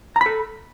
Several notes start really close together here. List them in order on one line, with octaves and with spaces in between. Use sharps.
A#5 B5 A4